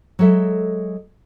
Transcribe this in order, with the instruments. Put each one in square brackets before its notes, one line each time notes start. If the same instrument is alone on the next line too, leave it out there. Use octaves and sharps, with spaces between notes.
[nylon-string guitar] F#3 G#3 A4 E5